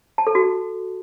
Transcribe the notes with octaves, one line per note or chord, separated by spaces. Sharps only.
A5
A4
F#4